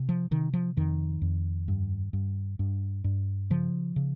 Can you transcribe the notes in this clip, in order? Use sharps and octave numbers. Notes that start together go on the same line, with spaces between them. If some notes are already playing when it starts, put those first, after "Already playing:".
Already playing: C3
F3
C3 D#3
F3
F2 D#3
F2
G2
G2
G2
G2
C#3 F3
C#3